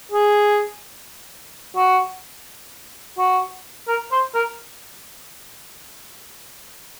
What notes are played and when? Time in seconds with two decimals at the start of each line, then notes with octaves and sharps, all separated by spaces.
0.12 G#4
1.76 F#4
3.18 F#4
3.88 A#4
4.12 C5
4.34 A#4